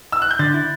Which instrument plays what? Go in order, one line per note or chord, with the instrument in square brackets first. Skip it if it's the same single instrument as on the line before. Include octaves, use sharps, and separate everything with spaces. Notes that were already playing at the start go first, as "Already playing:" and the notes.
[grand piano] E6
F#6
G6
[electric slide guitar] D3 [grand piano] A6
[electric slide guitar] E4